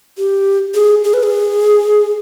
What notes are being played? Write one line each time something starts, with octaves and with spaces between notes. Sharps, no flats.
G4
G#4
G#4
B4
G#4